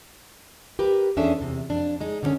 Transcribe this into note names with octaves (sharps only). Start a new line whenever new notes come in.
G4 A#4 B4
E2 C#4 D4 G#4 A4 E5
E2 C3
F2 D4
G#3 D#4
D3 D#3 G3 C4 C#4 D#4